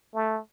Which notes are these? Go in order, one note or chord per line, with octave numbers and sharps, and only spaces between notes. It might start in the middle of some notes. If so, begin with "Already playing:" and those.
A3